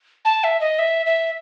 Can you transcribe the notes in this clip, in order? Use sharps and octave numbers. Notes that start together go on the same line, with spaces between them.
A5
E5
D#5
E5
E5